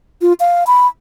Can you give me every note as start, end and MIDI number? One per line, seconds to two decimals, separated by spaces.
0.21 0.33 65
0.40 0.64 77
0.67 0.87 83